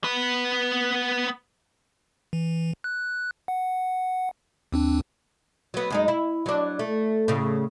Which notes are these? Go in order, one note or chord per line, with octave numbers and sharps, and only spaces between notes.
B3 B4
E3
F#6
F#5
D#2 C4 D4
F#3 B3
F#2 G#3 D#4
E4
F#3 D4
A3
A2 C#3